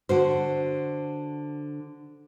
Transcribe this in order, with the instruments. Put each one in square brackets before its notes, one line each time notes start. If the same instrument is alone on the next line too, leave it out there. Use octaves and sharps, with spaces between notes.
[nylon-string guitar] D3 F#4 C5